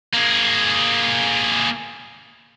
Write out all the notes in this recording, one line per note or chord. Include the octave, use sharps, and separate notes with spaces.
A#3 G#4